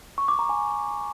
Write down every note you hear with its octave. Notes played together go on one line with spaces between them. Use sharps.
C#6
D6
A#5
G#5